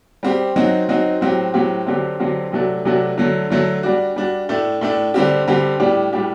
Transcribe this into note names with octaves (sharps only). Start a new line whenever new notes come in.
G3 C4 G4
F#3 C4 D#4 F#4
F#3 C4 D#4 F#4
A2 F#3 C4 G4
A2 F#3 C4 G4
D3 F#3 C4 G4
D3 F#3 C4 G4
C3 F#3 A3 D4 F#4
C3 F#3 A3 D4 F#4
D3 F#3 A3
D3 F#3 A3
G3 D4 F#4
G3 D4 F#4
A2 A3 D4
A2 A3 D4
D3 G3 C4 G4
D3 G3 C4 G4
A2 G3 D4 G4
A2 G3 D4 G4